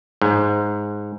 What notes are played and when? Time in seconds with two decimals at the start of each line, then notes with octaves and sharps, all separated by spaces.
0.22 G#2